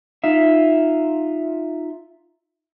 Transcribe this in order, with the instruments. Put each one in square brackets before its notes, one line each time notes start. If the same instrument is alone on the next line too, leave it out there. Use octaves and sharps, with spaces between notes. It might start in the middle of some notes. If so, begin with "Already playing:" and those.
[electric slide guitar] D#4 F4 E5